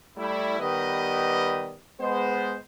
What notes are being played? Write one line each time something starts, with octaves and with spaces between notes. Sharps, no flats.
G3 A3 E4
D#3 G3 B3 G4 B4 D#5
G#3 B3 C5